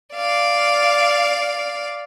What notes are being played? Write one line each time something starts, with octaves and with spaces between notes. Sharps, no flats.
D5 F5